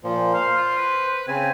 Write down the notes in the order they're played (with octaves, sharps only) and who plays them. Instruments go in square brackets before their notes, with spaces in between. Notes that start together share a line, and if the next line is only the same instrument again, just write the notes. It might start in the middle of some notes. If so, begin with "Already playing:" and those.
[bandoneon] A#2 F3
[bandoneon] C5 [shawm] F5
[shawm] F4
B4
[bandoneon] C#3 C4 [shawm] G#5